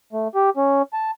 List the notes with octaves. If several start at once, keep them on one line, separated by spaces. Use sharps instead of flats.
A3
G4
C#4
A5